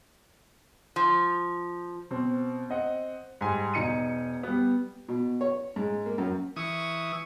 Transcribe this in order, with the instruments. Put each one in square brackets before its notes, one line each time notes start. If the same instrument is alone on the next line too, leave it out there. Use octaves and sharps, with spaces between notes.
[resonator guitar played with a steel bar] F3
[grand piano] B2 C4
C4 D#5 F#5
G#2 G3 G#5
E1 D#4 C#7 D#7
G3 B3
[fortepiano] B2
C#5
G#2
A#3
F#2
[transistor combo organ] E3 D#6 [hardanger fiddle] C#6